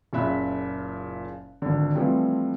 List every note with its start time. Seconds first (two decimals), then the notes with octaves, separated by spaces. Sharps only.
0.13 F#1 A#2 C#3 E5 B5 F#6
1.62 G#1 D3
1.95 E3 F3 G3 A3 C4